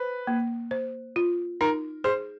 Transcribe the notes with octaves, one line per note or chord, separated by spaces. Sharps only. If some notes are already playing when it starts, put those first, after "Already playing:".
Already playing: B4 C5
A#3
C5
F4
D#4 A#4
G#4 C5